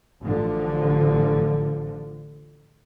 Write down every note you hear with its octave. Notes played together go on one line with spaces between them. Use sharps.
A1 D3 F3